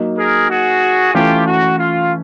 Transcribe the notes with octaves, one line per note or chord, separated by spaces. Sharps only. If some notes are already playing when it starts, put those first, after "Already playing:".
Already playing: F#3 A#3 D#4
G#4 A#4
F#4 G#4
E3 A3 C#4 F4 G4
F#4
F4